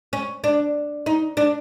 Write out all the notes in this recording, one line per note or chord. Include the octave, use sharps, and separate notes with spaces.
C#4
D4
D#4
D4